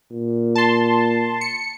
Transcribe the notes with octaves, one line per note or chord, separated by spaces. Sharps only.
A#2
A5 C6
C#7